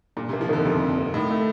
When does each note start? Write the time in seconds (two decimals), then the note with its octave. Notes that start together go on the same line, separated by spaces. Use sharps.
0.17 A#2 D4
0.29 C3 A#3
0.41 F3
0.49 D3 D#3
0.65 F2 C3
0.82 D4
0.98 A#3
1.14 A2 D#4
1.30 A3